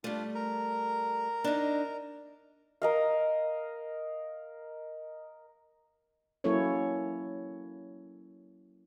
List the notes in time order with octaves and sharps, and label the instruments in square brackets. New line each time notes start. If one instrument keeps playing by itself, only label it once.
[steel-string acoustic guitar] G3 A3 [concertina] D4 F4
[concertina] A#4 A#5
[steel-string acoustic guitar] D4 D#4
[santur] A#4 D#5 F5
[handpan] F#3 A#3 C#4 E4 A4 C#5